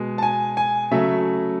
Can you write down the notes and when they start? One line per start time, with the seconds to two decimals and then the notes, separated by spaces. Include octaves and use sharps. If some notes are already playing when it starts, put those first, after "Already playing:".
Already playing: B2 G#3
0.18 A5
0.23 G#5
0.57 G#5
0.91 C#3 F#3 A3 E5